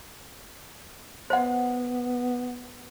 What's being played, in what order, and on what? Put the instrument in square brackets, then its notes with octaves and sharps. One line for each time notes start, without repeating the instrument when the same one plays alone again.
[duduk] B3 [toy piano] C5 F#5